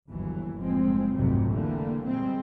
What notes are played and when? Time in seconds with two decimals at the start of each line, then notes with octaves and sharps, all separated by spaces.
0.10 G1 D#2 E3 F#3
0.59 F#1 A2 F3 G#3 C4
1.15 F1 C2 G#2 C3 F#3 G3
1.52 D3 E3 G3 A3 A#3
2.07 A#2 G3 G#3 C4